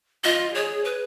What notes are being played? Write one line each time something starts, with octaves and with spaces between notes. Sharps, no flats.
F4 D#5
G#4 C#5
B4